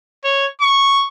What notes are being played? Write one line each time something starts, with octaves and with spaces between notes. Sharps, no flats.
C#5
C#6